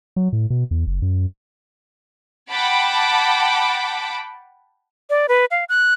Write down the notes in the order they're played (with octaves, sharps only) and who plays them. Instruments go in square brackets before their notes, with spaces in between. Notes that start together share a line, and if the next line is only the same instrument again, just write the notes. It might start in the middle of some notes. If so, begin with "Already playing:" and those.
[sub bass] F#3
A2
B2
E2
F#1
F#2
[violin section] F#5 G5 A5 B5 D6
[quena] D5
B4
F5
F#6